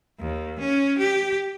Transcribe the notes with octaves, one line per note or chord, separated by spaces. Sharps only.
D#2
C#4
G4